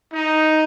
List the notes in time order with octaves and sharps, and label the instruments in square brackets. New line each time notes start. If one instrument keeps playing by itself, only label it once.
[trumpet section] D#4